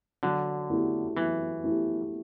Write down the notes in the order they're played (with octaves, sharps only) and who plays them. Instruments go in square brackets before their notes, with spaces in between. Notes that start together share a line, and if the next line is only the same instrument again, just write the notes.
[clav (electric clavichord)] D3 [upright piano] F#3
[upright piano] A3 E4 G4
[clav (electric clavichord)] E3 [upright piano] F#3
[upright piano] A3 E4 G4